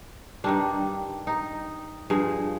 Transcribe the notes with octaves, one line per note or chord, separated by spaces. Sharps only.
G2 D#3 G3 D4
D#4
G2 F3 G#4